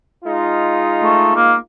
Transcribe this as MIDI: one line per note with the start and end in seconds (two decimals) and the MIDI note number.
0.24 1.58 56
0.24 1.58 63
0.24 1.58 65
1.03 1.33 57
1.35 1.55 58